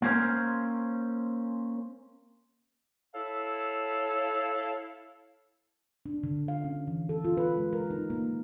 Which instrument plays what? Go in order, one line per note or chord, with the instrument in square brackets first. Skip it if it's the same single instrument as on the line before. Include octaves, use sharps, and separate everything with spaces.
[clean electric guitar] A#3 C4 C#4 A#4 C5
[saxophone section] E4 A4 C#5 F5
[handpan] D4
D3
F5
C#4
E3
A4
F4
B4
G#3
A#4
D#4
A#3